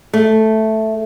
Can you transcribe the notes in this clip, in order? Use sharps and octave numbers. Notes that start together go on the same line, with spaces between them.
A3